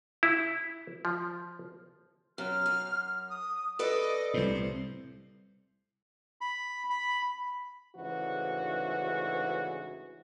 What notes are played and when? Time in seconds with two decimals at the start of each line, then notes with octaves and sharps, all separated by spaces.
0.23 E4
1.05 F3
2.38 F#2 F6
2.66 F#2
3.29 D#6
3.79 A4 B4 D5 D#5
4.34 C2 A2 C5
6.41 B5
6.90 B5
7.96 D2 G#2 C#3 E3 F#4